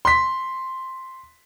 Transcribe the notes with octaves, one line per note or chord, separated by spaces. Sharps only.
C6 B6